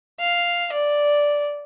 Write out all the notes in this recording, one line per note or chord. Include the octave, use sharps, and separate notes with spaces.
F5
D5